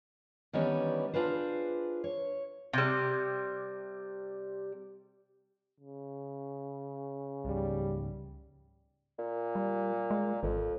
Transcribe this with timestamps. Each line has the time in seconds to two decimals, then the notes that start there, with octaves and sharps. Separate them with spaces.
0.53 D#3 E3 G3 B3 C#4 D4
1.14 D4 F4 G#4 B4 C5
2.04 C#5
2.73 C3 G3
5.80 C#3
7.45 C#2 G#2 G3
9.18 A#2
9.55 G3
10.11 G#3
10.43 G#1 F2